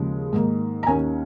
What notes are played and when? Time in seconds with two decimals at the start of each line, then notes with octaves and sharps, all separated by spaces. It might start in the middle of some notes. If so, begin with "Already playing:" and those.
Already playing: D#2 C#3 F3 G#3
0.33 G#2 D#3 A#3
0.83 A#5
0.87 D#2 D#3 A#3 C#4 G#5